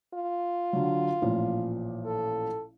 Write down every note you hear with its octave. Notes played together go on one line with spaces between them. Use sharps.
F4
D3 F#3
A1 A#2 F3
A4